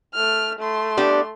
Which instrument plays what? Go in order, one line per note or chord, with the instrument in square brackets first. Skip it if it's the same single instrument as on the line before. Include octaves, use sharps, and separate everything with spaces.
[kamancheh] A3 F6
A3 C6
[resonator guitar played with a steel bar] B3 D4 G4